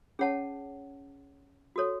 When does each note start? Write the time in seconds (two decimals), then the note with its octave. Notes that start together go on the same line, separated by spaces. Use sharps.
0.19 C#4 G#4 C#5 F#5 A5
1.76 F#4 A4 C#5